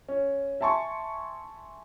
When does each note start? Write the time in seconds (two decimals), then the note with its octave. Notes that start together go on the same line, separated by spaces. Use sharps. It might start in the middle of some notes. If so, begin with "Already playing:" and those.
0.09 C#4
0.61 E5 G#5 A5 C6 C#6